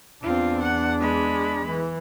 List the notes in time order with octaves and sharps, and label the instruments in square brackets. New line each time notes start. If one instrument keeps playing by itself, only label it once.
[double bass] E2 D4 [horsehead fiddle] C4 F4
[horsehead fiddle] F#5
G#3 B5
[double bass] E3